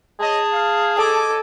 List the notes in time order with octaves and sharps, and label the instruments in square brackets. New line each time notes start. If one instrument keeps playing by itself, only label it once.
[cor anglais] G#4 [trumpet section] C#5 D#5 [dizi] A5
[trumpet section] F5
[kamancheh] A4 [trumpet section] D#5 G#5 D6